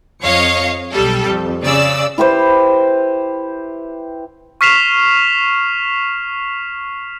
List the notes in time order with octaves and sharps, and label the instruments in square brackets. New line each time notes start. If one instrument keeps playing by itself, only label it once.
[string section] F2 C#5 D#5 F5 C#7
B1 G3 A4
F2
C#3 D5 E6
[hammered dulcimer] E4 G4 B4 C5
[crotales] C#6 F6 B6 C7 E7 F7